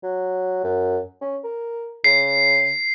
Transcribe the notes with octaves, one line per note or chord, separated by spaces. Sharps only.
F#3
F#2
C#4
A#4
C#3 C7